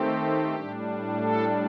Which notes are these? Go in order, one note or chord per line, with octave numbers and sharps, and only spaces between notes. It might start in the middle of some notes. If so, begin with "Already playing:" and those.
Already playing: D#3 A3 C4 G4
A2 G3 D4
A4